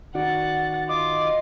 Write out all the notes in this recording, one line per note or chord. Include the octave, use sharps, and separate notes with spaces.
D#3 F#4 D5 F#5 A6
F4 D#5 D6